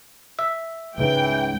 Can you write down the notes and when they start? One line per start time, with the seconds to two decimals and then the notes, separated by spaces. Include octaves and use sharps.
0.39 E5
0.98 C#2 G#2 C#3 E3 G5